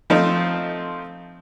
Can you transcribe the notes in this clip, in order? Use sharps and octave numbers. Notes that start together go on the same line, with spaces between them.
F3 A3 C4 D#4 F4